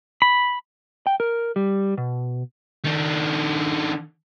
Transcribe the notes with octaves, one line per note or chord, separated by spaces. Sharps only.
B5
G5
A#4
G3
B2
D#3 D4